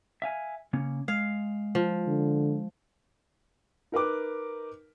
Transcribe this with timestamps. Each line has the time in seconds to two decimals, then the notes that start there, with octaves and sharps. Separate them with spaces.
0.22 E5 F5 G#5
0.73 C#3 A#3 C#4
1.08 G#3 F5
1.75 F3
2.07 D3
3.92 D#4 A#4 B4 D6